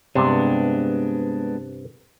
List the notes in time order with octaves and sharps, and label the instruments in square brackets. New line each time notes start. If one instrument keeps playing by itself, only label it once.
[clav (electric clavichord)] G2 C3 [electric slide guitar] G#3 B3 D4